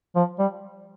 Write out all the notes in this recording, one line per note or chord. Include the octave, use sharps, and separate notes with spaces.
F3
G3